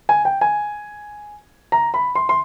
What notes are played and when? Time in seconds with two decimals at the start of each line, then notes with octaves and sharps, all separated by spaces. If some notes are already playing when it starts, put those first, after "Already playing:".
0.09 G#5
0.25 G5
0.41 G#5
1.72 A#5
1.94 B5
2.15 C6
2.29 C6